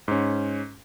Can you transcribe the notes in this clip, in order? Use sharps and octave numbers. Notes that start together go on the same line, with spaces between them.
G#2 C#4